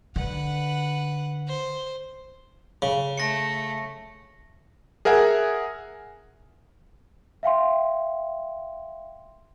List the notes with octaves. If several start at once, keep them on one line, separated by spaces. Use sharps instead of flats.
D3 B4 F#5
C5
C#3
A3 A#6 C#7
G#4 A#4 E5 F#5 G#5
E5 F5 G5 C6